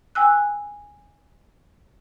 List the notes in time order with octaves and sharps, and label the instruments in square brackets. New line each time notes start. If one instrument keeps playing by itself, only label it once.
[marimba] G5 G#5 E6 F#6